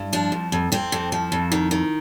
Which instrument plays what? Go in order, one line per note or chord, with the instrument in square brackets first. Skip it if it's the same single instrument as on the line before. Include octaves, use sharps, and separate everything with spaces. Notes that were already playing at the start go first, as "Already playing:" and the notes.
Already playing: [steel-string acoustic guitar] G2
F3 D4
F2
F2
F2 C4
F2
F3
F2
D#3
D#3